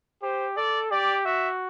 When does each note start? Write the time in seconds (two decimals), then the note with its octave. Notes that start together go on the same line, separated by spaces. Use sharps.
0.23 G4 C5
0.57 A4 D5
0.91 G4 D5
1.25 F#4 E5